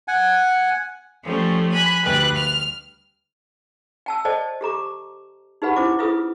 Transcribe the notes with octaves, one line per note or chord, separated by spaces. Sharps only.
F#5 G#5
F3 G3 A3 C#4
G#5 B5 F#6
D2 G3 B4 F#6
F6
G5 A5 E6
A4 C5 D5 D#5 G5 A5
G4 A4 A#5 D6
D#4 G4 G#4 B4 F#5 B5
C#4 E4 C5 D6
E4 F4 G#4 A4 B4 D#6